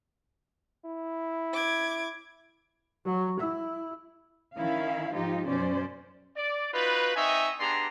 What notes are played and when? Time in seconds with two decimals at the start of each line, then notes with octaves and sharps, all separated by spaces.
0.85 E4
1.54 D6 G#6
3.05 F#3
3.40 E4
4.57 D#3 C#4 E4 F5
5.13 G#2 F3 D#4 F4 G4
5.48 F#2 B2 C#4 C5 D5
6.37 D5
6.74 D#4 F4 F#4 B4
7.16 C4 D#4 D#5 E5 G#5 C#6
7.60 B3 D4 G4 G#4 A#5 C6